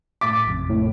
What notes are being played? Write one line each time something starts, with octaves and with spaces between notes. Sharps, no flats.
A2 D6 A6 B6
A1 F2 C3
A2